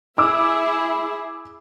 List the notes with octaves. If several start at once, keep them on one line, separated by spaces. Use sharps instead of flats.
E4 G#4 E5 D6 E6